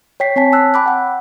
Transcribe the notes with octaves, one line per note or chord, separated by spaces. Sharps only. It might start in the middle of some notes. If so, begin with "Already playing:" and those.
C#5 G5 B6 C7
C4 C#5 G#5 A5 B6
A5 E6 F#6
G5 B5 D6 F#6
F#5 G5